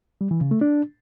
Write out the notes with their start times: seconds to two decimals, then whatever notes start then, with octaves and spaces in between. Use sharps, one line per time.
0.21 G3
0.31 E3
0.41 C#3
0.51 A3
0.61 D4